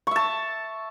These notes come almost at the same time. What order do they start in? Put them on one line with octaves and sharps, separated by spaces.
C#6 E5 A5